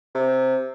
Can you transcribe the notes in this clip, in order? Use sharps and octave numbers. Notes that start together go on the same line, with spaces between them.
C3